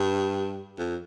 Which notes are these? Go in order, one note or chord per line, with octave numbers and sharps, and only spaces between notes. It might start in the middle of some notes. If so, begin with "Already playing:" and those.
Already playing: G2
F2